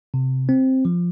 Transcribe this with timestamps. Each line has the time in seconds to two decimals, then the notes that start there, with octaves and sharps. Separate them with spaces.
0.14 C3
0.49 C4
0.85 F3